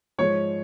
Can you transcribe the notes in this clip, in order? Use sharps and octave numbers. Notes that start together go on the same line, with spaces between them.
G#2 F3 G#3 C#5